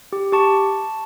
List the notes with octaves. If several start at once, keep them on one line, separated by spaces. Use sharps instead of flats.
G4
G4 A5 C#6